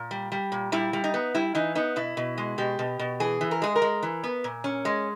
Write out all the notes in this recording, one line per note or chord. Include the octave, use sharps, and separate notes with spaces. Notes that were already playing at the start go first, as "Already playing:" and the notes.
Already playing: A#2
G3
G3
A#2
G3 E4
G3
D#4
B3
G3 E4
E3 D#4
B3 D#4
B2 E4
B2
G#3
B2 G4
B2
B2
E3 G#4
E3
A#4
G#3 G#4
A#4
G#3
E3
B3
A#2
C#4
G#3